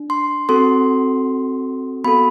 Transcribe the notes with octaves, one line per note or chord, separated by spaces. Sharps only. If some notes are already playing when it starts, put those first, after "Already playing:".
Already playing: D4
C6
C4 F#4 A4 C6
B3 F#4 A4 B5